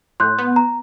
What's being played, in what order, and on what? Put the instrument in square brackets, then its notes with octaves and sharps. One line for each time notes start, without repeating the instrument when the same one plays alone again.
[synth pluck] A2 [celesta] C6 F#6 G6
[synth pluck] B3
[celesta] A#5